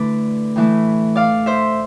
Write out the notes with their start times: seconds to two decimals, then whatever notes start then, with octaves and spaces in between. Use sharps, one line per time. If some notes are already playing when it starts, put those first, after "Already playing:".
Already playing: D3 A3 E4 B4 D5
0.56 A2 E3 A3
1.16 D5 F5
1.46 C5 E5